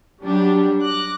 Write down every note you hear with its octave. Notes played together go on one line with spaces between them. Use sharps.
F#3 G3 D4 G4
D6 F#6 A#6